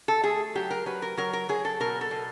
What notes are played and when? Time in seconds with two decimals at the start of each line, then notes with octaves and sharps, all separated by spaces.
0.08 A4
0.24 A3 G#4
0.55 F#3 G4
0.71 A#4
0.86 F#3 B4
1.02 A#4
1.17 F#3 A#4
1.33 A#4
1.49 F#3 G#4
1.65 A4
1.80 B2 A#4
2.01 A4
2.11 B2